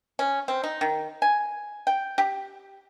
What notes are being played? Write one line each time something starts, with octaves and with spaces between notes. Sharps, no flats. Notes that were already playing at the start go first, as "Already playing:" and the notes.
C#4
C4
D#4
D#3
G#5
G5
G4